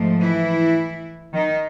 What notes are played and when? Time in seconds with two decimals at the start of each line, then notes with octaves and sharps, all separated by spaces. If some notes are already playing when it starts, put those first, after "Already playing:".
Already playing: G#2 F3 A3
0.18 E3 E4
1.33 D#3 D#4